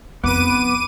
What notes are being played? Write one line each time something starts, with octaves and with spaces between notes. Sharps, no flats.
F1 F2 B3 B4 D6 D#7